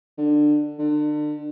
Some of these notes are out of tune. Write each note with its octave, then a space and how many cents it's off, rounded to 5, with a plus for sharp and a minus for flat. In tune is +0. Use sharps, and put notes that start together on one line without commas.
D3 +20
D3 +35